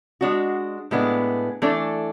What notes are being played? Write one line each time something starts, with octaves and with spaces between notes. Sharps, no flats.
G#3 D4 F#4
A2 G#3 B3 D4
E3 A3 D4 A4